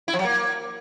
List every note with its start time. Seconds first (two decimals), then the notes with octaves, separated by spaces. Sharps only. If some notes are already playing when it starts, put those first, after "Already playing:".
0.08 E4
0.13 F3
0.19 F#3
0.25 A#3